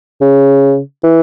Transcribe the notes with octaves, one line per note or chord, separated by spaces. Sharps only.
C#3
E3